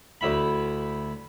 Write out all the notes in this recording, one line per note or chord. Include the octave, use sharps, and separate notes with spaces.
D2 E4 B5